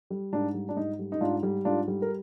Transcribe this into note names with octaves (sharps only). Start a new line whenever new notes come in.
G3
G#2 D4
G3
D4
G#2 D#4
G3
D#4
G#2 D4 F4
G3
G#2 D4 F4
G3
A#4